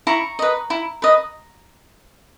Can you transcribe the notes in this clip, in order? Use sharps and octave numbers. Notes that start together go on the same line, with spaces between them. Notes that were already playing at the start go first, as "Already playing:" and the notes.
E4 A#5 C#6
B4 D#5
E4
B4 D#5